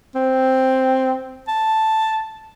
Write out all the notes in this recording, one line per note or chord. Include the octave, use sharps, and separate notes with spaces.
C4
A5